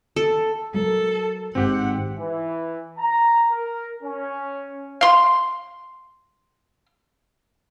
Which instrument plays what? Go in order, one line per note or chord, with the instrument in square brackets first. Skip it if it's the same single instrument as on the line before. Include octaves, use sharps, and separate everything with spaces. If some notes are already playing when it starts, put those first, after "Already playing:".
[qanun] A4
[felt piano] F#3 A#4 [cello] A4
[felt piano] G#1 G#2 [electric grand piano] C4 G4 [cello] F#5
[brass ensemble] E3
A#5
A#4
C#4
[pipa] F5 C6